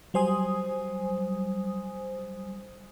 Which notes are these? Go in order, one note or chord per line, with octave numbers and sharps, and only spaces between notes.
F#3 G3 C5 G#5 D#6